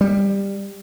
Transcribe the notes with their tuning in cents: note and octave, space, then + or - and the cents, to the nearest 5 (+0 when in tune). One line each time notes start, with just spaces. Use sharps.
G3 +15